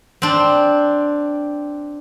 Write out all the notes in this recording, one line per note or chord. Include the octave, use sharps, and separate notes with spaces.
C4 D4